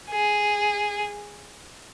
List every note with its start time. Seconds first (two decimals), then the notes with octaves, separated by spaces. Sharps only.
0.10 G#4